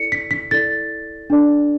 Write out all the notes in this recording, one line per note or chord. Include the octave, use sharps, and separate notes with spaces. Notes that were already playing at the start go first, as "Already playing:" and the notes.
Already playing: E4 A4 D5 C#7
B6
B6
E4 A4 D5 A6
D4 A4 D5